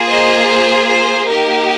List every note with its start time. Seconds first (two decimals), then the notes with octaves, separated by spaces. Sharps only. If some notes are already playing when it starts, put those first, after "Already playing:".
Already playing: A#3 F4 G#4
0.09 C5 D#5
0.48 C5
0.88 C5
1.26 A#3 D#4 G4 A#4